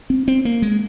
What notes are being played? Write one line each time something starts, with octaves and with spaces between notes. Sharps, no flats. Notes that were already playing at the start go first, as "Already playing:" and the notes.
C4
C4
A#3
G#3